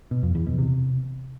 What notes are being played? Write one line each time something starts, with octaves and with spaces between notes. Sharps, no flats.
B2
F2
E2
B2
C3